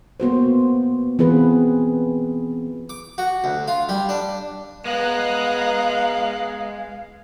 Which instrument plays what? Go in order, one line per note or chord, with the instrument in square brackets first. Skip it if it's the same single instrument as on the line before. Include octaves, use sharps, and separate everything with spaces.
[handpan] A#3 B3 F#4 C5
E3 B3 C4 F4 G#4 B4
[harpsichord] D6
F#4
D2
F4
G3
D4
[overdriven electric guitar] G#3 [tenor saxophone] B3 [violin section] D#5 A#5 F#6 [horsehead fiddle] F5